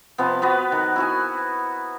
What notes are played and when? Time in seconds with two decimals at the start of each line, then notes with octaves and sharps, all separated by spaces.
0.18 C3 F3 B3
0.42 B3 F#4 B4
0.72 D#3
0.96 E4 F#4 G#5